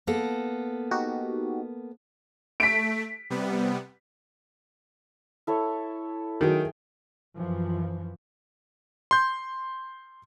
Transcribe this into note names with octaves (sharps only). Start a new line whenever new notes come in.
A#3 B3 A4
D#4 F#4 G4
A3 B6 D7
C3 G3 B3
E4 A4 C#5
D#3 F#3 G#4 G5
F#2 E3 F3
C6 G6